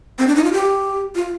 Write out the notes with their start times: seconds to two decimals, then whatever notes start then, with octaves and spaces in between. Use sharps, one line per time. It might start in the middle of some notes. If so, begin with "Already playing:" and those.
0.19 C4
0.27 D4
0.36 D#4
0.44 F4
0.52 G4
1.15 F4